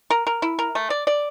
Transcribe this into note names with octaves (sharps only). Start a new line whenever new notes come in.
A#4
A#4
E4
A#4
A3
D5
D5